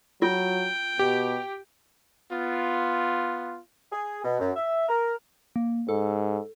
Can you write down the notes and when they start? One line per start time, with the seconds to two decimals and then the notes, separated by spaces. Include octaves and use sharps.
0.22 F#3 F4 G5
0.99 B2 G4
2.31 B3 F4
3.91 G#4
4.24 B2
4.40 F#2
4.56 E5
4.88 A#4
5.56 A#3
5.89 G#2 A4